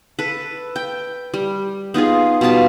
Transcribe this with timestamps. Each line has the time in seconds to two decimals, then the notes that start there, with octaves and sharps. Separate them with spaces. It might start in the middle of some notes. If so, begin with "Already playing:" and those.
0.19 A4 B4
0.76 G5
1.34 G3
1.94 B3 D#4 F4 G#4
2.41 B2 G3 F4 A5